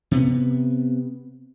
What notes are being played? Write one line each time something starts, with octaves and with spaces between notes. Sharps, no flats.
C3 B3